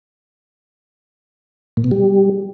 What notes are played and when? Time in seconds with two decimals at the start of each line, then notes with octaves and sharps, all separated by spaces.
1.77 A#2
1.84 B2
1.91 G3